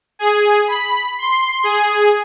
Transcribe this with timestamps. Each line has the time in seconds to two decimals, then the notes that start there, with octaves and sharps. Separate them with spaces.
0.19 G#4
0.68 B5
1.18 C6
1.64 G#4